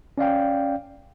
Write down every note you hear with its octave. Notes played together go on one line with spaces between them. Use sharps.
C#4 D5 F5 G5